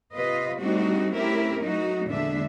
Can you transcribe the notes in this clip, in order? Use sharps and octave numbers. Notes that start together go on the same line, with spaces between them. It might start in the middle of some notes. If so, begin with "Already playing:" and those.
C3 F4 B4 D#5
G3 A3 C4 D4 D#4 F#4
A3 C4 C#4 E4 G4 A#4
F#3 A3 D#4 F#4
E2 A#2 D3 G#3 D4 E5